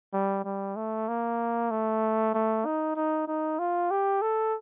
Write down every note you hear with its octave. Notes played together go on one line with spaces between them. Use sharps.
G3
G3
A3
A#3
A3
A3
D#4
D#4
D#4
F4
G4
A4